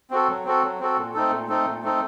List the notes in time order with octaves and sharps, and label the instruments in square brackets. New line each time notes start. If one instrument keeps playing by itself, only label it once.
[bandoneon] C4 F#4 A4
F#3
C4 F#4 A4
F#3
C4 F#4 A4
A#2
A3 C4 D#4 A4
A#2
A3 C4 D#4 A4
A#2
A3 C4 D#4 A4